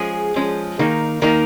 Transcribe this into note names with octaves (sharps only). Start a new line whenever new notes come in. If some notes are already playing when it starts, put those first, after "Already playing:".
Already playing: F3 G#3 C#4 G#4
F3 G#3 C#4
D#3 A#3 D#4
D#3 A#3 D#4 A#4